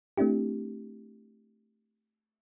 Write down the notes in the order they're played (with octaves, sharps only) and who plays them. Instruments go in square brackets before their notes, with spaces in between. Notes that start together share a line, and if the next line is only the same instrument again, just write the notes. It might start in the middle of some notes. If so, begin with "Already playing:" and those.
[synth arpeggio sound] A3 C4 D4 E4 G4